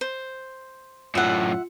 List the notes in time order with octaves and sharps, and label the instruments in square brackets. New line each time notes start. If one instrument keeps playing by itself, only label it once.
[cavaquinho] C5
[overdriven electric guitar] F#2 A2 [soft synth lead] F4 [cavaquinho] E5 F#5